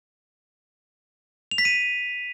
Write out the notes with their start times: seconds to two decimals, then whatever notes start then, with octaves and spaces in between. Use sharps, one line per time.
1.51 F7
1.58 B6
1.65 D#7